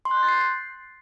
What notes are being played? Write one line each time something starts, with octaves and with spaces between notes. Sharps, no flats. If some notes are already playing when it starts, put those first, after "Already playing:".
C6
F#6
G6
A6
C7